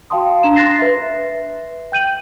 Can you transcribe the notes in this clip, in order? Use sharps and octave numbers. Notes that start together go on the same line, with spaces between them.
F#4 F5 G5 A5 C6 D#6
D4 A#5 E7
C6 F#6 A6 A#6 C7
B4 E5
G5 G6 D#7 F#7